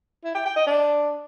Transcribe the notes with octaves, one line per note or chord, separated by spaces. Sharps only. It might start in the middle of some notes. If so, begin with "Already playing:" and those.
E4
G5
G5
D#5
D4